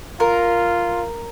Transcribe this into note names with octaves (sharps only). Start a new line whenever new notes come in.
F4 A#4